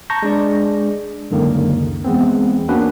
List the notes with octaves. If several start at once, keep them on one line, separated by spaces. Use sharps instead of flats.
A5 A#5 C#6 G6 A#6
G#3 D4 D5
C#2 F#2 D3 D#3 A#3
E2 G#3 B3 C4
A#3 B3 C#4 D4 F#4 B4